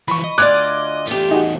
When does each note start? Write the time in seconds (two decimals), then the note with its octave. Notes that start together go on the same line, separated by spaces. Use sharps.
0.08 E3 F3 B5 C#6
0.24 D#5
0.38 D2 F4 D5 D6 F#6 G#6
1.07 E2 A3 F4 G4
1.31 D#4 F#4 G#4